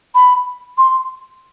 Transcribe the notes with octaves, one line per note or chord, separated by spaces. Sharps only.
B5
C6